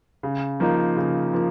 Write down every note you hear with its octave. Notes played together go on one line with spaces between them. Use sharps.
C#3
F3 A#3 D#4
C#3
F3 A#3